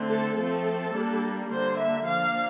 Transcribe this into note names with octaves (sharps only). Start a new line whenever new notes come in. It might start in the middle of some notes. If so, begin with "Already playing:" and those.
Already playing: D3 A3 C4
A4
F3 A3 C4 A4
G3 A#3 D4
D3 G3 A#3 D4 C5
E5
F3 A#3 D4 F5